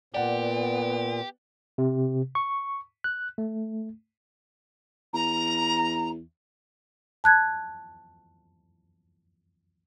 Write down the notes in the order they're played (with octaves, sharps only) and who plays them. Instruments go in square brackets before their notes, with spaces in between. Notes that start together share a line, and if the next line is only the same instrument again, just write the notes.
[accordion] A#2 [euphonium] B3 [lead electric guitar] G4 [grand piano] D5 F#5
[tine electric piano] C3
C#6
F#6
A3
[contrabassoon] E2 [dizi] A#5
[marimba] A5 F#6 G#6